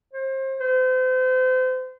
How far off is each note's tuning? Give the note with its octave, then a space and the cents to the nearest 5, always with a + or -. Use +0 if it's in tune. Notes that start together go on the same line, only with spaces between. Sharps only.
C5 +30
C5 -35